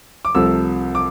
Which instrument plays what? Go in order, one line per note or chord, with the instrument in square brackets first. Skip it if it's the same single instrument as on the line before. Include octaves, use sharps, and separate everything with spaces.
[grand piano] D6
C2 C3 F3 A3 E6
D6